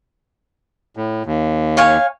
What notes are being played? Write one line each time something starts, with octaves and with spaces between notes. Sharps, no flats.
A2
D#2
C#5 F5 G#5